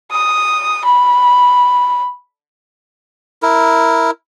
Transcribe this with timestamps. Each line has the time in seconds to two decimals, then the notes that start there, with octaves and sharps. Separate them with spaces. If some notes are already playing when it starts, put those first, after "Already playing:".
0.12 D#6
0.85 B5
3.42 E4 A#4